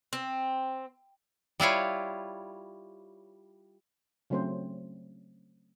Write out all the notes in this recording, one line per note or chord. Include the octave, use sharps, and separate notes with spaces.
C4
G3 E4 F4 C#5
C#3 F#3 A3 C4 C#4 C5